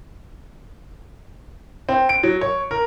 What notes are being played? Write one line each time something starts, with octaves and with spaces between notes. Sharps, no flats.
C4
D7
F#3
C#5
A#4